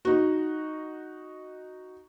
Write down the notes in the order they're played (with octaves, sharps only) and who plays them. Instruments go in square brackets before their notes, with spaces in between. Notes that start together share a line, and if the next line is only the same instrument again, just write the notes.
[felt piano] D#4 F#4